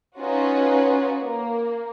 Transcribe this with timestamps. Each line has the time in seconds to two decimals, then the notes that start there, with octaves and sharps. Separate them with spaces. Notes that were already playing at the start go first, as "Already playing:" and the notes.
0.18 C#4 D#4 F4 F#4 B4
1.20 A#3